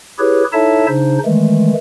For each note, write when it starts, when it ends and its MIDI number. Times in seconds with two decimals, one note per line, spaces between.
0.19 0.44 64
0.19 0.44 67
0.19 0.44 68
0.19 0.44 71
0.19 0.44 73
0.53 0.86 63
0.53 0.86 64
0.53 0.86 69
0.53 0.86 73
0.53 0.86 76
0.53 0.86 81
0.88 1.18 49
0.88 1.18 62
0.88 1.18 63
0.88 1.18 72
1.25 1.73 51
1.25 1.73 52
1.25 1.73 56
1.25 1.73 57